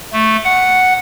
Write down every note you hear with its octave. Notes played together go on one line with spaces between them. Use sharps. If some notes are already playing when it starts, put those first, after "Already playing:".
A3
F#5